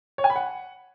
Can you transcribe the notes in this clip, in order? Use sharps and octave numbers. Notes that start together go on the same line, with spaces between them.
C#5
G#5
B5
F#5